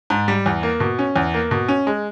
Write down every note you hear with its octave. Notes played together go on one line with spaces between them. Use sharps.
G#2
G3
E2
A#3
B2
C#4
E2
A#3
B2
C#4
G#3